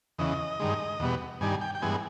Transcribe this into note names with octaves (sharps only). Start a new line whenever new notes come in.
E2 C#3 E3 D#5
G2 D#3 G#3
E2 B2 G3 B3
G2 D#3 G3 G#5
G5
G5
G2 E3 G#3 B3 G#5